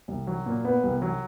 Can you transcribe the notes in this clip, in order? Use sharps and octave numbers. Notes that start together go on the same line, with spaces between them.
C2
F#3
A#2
B3
C2
F#3